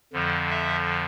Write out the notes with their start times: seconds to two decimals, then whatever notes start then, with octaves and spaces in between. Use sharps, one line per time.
0.13 F2 D3 F3
0.50 E5